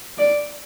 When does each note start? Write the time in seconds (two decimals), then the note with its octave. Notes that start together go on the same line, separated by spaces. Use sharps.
0.18 D5